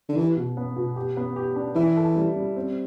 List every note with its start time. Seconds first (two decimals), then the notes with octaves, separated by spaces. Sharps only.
0.09 D3
0.16 E3 G4
0.36 B2
0.57 B3
0.76 B2
0.96 G4
1.17 B3
1.36 G4
1.56 D4
1.75 E3 E4
1.97 A4
2.16 G3
2.36 G3
2.56 C4